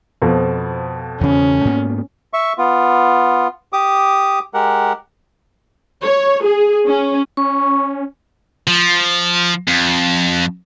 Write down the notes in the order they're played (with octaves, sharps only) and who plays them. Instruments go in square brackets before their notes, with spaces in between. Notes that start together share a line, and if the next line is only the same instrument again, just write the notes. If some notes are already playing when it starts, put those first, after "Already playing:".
[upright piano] F2 B2 F3
[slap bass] E2 C#3 [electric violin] C#4
[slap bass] G#2 A#3 B3
[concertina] E5 C#6
B3 F4
G4 D6 D#6
G#3 G4 A#4 F#5
[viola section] C#5
G#4
C#4
[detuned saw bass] C#4 [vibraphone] C#6
[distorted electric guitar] F3
F2